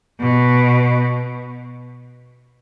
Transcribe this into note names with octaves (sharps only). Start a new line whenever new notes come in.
B2